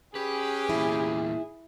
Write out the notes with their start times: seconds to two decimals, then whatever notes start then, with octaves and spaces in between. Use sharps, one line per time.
0.15 C#4 G4 G#4 B4
0.69 E2 A#2 E4